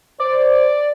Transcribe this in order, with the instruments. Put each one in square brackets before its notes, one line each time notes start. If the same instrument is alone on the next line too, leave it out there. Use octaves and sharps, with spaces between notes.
[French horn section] C5 [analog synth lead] D5